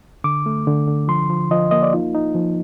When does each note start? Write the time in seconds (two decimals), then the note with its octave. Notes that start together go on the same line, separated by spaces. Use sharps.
0.24 D3 D6
0.46 A3
0.67 D3
0.87 D3
1.08 F3 C6
1.30 F3
1.51 F3 D#5
1.71 A#3 D#5
1.83 D5
1.93 D#4 F4
2.15 D#4
2.35 F3